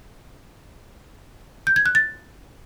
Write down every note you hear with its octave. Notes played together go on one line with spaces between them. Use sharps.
G6
G#6
F#6
A6